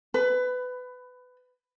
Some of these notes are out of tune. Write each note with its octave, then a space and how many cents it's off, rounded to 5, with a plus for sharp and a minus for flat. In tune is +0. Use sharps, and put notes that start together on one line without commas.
B4 +20 B5 +5